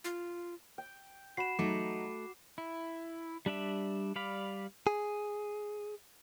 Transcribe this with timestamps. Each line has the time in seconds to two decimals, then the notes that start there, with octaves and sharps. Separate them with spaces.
0.04 F4
0.78 G5
1.37 F#4 B5 C7 E7
1.59 F#3 A3 D#4 D6
2.58 E4
3.46 G3 D4 D5 E5
4.16 G3 D5 F5 B5
4.87 G#4